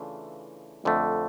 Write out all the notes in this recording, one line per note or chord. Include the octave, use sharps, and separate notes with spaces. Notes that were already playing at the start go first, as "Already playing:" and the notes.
Already playing: C#3 E3 A3 D4 F4
F2 D3 A3